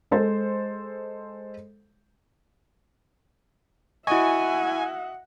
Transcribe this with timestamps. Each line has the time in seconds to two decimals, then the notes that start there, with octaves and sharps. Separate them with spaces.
0.11 G#3 A4 C5
4.07 E4 F#4 D#5 E5 F#5 G#5 C#6